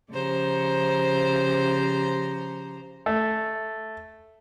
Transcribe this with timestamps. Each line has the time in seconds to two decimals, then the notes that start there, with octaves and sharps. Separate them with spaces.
0.11 C#3 F3 G4 C5 A#5
3.06 A3